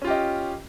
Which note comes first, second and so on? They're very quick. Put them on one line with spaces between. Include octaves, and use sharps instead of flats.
C#4 F4 G4 D#5